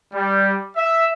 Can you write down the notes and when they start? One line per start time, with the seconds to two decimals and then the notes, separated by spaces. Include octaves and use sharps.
0.13 G3
0.75 E5